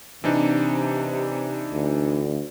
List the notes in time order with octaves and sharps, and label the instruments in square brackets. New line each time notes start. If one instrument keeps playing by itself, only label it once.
[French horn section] C3 [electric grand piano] E3 D4 D#4
[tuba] D2